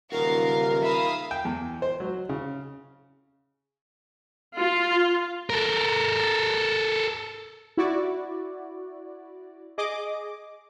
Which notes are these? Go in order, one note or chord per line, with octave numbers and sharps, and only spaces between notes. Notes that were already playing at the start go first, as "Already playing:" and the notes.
D#1 C#3 F#4 A#4 F5
D#2 E5 F5 B5 D#6
G5
E2
C5
F#3
C#3
F4
A4 A#4
E4 F#4 D5
G#4 D#5 D6